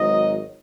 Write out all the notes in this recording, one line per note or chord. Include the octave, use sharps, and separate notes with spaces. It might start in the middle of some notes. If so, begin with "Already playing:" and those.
Already playing: G#1 G#2 F#3 D#4 D#5